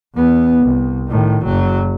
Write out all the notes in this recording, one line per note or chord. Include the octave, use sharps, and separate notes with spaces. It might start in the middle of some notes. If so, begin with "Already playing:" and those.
E2 B3
C2
A2 D#3
F#1 F#3